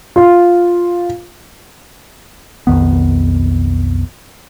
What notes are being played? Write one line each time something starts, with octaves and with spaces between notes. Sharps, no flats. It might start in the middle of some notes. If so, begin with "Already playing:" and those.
F4
B1 F2 D#3 B3